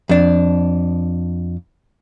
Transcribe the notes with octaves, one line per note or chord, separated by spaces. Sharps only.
F2 D4